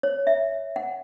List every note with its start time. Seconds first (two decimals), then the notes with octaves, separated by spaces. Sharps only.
0.03 C#5
0.27 E5
0.76 F#5